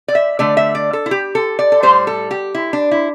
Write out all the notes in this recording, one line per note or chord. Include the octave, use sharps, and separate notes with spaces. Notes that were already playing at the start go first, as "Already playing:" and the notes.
D5
E5
D3 A3 D5
E5
D5
A4
E4
G4
A4
D5
A4
A2 G3 C5
A4
G4
E4
D4
E4